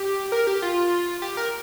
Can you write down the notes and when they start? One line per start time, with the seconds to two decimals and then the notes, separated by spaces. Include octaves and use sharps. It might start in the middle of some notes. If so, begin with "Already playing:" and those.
Already playing: G4
0.32 A#4
0.47 G4
0.62 F4
1.22 G4
1.37 A#4